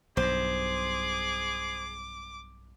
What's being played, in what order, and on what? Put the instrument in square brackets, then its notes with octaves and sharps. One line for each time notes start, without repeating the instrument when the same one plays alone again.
[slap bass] B1 G2 [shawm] G#4 [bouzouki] C5 [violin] D6